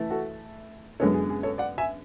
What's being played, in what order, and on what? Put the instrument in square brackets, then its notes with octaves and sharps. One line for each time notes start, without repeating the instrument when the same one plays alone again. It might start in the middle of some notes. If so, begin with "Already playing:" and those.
Already playing: [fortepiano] E3 A3 E4
[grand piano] F#4 A4
[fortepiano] F#2 D3 G#3 B3 [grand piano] A4 C#5
[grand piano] G#4
G#4
A4 C#5
D5 F#5
E5 G#5